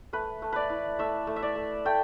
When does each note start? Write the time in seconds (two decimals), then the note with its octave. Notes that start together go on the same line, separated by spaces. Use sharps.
0.13 A3 B4
0.42 A3
0.53 B4 D5
0.70 E4
0.99 A3 E5
1.27 A3
1.36 E5
1.42 D5
1.56 A3
1.85 A3 G5